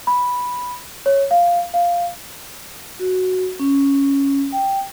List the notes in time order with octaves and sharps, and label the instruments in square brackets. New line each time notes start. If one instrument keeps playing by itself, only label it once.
[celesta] B5
C#5
F5
F5
[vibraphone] F#4
C#4
G5